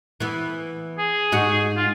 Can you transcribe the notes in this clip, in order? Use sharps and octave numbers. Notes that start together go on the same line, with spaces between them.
E3 B3
G#4
G#2 D#4 F#4
F4